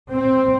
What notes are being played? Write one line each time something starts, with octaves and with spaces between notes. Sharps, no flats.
C4